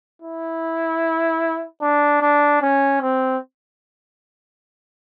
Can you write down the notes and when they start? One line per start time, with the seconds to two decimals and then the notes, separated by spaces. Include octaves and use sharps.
0.22 E4
1.82 D4
2.21 D4
2.62 C#4
3.01 C4